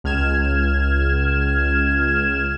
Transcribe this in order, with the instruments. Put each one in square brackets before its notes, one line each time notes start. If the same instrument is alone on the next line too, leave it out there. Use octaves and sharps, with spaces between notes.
[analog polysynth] C#2 F6 G#6 E7